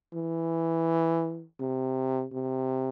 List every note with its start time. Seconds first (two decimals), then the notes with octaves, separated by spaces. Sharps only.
0.14 E3
1.60 C3
2.33 C3